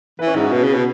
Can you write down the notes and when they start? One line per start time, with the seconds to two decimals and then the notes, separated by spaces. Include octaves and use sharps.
0.19 E3 B4
0.27 C#4
0.35 G#2 E4
0.44 F#4
0.51 B2 B4
0.63 C#3
0.74 B2